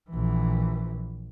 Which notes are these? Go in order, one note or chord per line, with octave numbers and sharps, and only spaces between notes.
A#1 E3